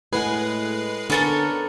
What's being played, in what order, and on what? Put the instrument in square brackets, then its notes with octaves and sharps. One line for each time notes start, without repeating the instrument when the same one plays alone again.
[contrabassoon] A2 [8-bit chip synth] G#3 B4 C7 [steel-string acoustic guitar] F#5 G#5
[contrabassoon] D3 [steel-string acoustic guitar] B3 [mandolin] C#4 A4 A#4